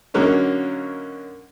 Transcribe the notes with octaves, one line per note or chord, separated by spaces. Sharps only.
D3 F#3 A#3 C#4 D#4